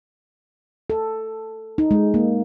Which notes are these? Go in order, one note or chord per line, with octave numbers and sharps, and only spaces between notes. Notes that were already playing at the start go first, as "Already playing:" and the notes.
A4
D#4
G#3
A#3